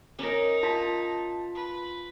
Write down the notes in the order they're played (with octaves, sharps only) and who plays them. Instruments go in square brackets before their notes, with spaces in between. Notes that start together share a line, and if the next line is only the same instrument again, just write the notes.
[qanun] C#4 A#4 [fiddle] D#4
[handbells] F4 B6 [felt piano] A5
[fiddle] B4